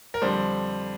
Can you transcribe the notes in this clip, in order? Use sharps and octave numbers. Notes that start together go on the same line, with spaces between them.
A#4
F2 D3 G3 C5